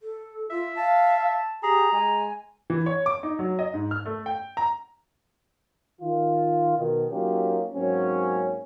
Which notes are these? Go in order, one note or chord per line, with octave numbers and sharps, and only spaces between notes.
A4
F4 E5
F5 A5
G4 G#4 A#5
G#3 G#5
E3
C#5
D6
D#4
F#3
D#5
G#2
F6
A3
G5
A#5
D#3 F4
B2 D#3
F#3 A#3 C#4 D#4 F4 G4
G#2 F#3 A#3 C4 C#4